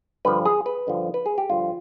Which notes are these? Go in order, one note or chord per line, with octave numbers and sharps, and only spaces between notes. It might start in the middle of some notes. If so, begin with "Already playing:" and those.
G2 D3 F3 B4
G#4
B4
G2 D3 F3
B4
G#4
G4
G2 D3 F3 F4